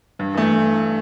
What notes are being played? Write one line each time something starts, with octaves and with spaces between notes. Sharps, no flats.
G2
E3 A3